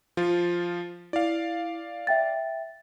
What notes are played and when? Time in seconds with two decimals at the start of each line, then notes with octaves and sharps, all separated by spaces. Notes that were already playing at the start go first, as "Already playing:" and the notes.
0.17 F3 F4
1.13 E4 D5 F5
2.07 E5 G5 A6